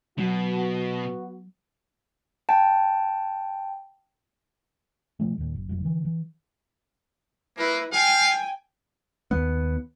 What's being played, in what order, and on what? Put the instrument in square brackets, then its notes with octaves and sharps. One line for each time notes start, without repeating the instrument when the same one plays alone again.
[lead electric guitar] B2 [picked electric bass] F#3 [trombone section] B3 F#4
[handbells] G5 A5
[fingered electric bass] B2 F3 A3
D#2 A#2
F#1
F1 B1 F#2
D3 E3
E3
[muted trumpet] A#3 [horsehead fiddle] E4 B4
[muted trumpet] F5 [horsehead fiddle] G5 G#5
[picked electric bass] D#2 B3